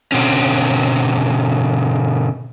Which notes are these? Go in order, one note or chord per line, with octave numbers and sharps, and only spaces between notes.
B2 D3 C4 C#4